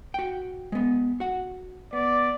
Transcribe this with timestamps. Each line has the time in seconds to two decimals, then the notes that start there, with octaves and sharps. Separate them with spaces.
0.14 F#4 G5
0.72 G#3 B3
1.20 F#4 F#5
1.93 B3 D5